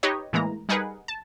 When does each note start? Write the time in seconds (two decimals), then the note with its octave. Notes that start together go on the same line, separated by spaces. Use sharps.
0.03 D#4 G4 B4 C#5 D#5
0.33 A2 E3 G#3 A#3 A#5
0.69 G3 D#4 G#4 A#4 B4 F#5
1.08 A5